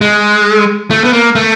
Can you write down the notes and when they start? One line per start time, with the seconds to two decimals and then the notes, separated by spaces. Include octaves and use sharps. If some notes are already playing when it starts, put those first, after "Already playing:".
0.01 G#3
0.90 A3
1.04 B3
1.13 A#3
1.35 A3